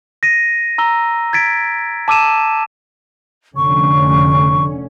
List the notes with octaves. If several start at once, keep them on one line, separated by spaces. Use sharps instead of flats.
A#6 D#7
A#5 E6 G7
G#6 A6 B6 D7
A5 D6 E6 D#7 E7
F1 D3 C#4 C#6